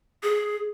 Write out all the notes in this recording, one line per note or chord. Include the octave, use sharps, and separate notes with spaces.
G#4